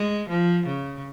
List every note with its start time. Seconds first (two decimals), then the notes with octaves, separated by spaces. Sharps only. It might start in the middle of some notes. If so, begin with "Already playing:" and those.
Already playing: G#3
0.29 F3
0.66 C#3